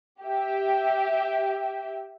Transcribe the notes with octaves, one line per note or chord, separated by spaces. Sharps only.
G4 E5